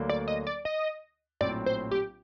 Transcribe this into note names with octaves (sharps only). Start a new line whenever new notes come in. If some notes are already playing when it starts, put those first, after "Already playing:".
Already playing: D2 D3 F#3 A#3 D4
D5
D#5
D5
D#5
A#1 A2 F#3 C4 D5
C5
G4